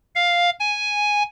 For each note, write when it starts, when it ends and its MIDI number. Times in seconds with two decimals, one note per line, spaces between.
0.16 0.50 77
0.60 1.23 80